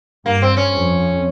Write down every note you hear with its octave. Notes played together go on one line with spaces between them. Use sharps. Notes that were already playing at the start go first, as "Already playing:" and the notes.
G2 A#3
C4
C#4
F2